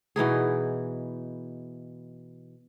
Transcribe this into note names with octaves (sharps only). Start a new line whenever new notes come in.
B2 E3 D#4 G#4